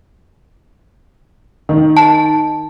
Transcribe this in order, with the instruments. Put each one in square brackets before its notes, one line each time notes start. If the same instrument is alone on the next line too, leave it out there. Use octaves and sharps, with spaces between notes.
[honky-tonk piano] D#3
[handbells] A5